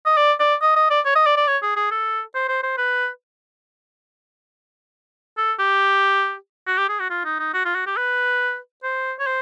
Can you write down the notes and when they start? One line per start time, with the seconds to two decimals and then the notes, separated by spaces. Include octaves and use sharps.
0.06 D#5
0.17 D5
0.40 D5
0.61 D#5
0.76 D#5
0.90 D5
1.05 C#5
1.15 D#5
1.26 D5
1.37 D5
1.47 C#5
1.62 G#4
1.76 G#4
1.91 A4
2.35 C5
2.49 C5
2.63 C5
2.78 B4
5.37 A4
5.59 G4
6.67 F#4
6.78 G4
6.89 G#4
6.99 F#4
7.10 F4
7.25 D#4
7.39 D#4
7.54 F#4
7.65 F4
7.75 F#4
7.86 G4
7.97 B4
8.83 C5
9.19 C#5
9.27 C5